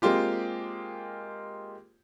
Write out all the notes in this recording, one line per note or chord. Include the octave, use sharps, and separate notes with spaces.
G#3 A#3 C4 F4 G4